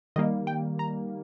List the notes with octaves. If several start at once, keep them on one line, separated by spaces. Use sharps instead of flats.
D#3 G3 A#3 D#5
G5
A#5